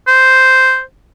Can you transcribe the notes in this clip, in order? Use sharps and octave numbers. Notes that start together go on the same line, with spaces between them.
C5